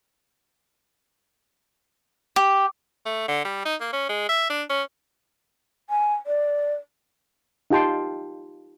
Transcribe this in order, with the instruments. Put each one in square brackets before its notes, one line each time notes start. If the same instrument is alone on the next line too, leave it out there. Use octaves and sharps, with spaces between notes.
[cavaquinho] G4
[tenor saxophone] A3
D3
G3
D#4
A#3
C#4
G#3
E5
D4
C#4
[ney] G#5
D5
[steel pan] D#4 F4 G4 G5 A5 C6